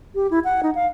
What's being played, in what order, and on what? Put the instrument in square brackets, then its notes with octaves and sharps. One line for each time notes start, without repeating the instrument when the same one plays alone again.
[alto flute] G4
E4
F#5
D#4
F5